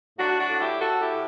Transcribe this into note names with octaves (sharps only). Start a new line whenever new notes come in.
A2 D4 F#4
D4 F#4
A2 F#4
E4 G4
A2 F#4 A4
E4 G4
A2